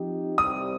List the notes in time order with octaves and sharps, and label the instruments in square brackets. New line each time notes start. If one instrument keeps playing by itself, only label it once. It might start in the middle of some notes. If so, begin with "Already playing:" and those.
Already playing: [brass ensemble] F3 C4 D#4 G4
[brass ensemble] C2 C3 G3 [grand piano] D#6